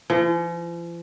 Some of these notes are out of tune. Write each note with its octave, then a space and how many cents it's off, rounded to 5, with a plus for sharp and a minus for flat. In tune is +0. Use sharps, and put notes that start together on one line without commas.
F3 -45